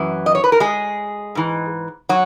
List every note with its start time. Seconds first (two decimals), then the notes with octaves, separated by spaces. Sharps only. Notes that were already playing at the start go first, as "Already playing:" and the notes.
Already playing: F#2 E3
0.26 D#5
0.35 C#5
0.44 B4
0.52 A#4
0.60 G#3 G#4
1.35 G#2 E3
2.09 F#3 F#4